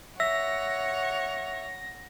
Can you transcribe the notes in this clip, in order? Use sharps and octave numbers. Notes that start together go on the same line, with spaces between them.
C#5 E5 F#5 A#6